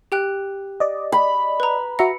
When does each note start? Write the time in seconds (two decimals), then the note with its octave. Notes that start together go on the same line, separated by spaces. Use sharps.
0.12 G4 G5 F#6
0.80 D5 D#5
1.12 B5
1.60 B4 A#5
1.99 F#4 E5 A#5 C#7